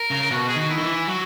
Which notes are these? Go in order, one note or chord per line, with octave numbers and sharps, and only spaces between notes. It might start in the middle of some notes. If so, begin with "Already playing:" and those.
Already playing: A#4
C#3
B2 F#4
G#4
D#3 F#4
E4
D#3
E3
F#3 F#4